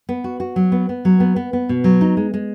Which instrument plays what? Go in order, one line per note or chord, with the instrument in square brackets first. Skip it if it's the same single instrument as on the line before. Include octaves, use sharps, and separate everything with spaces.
[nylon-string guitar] B3
F#4
F#4
F#3
B3
B3
F#3
B3
B3
B3
B2
F#3
D#4
G#3
G#3